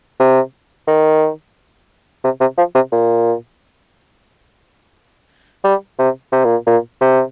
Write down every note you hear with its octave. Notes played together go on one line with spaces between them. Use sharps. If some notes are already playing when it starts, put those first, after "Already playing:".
C3
D#3
C3
C3
F3
C3
A#2
G3
C3
C3
A#2
A#2
C3